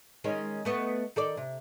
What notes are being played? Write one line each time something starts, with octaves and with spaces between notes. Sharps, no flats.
D#3 G#3 C#4
A3 B3 D#5
D#3 A4 D5
C3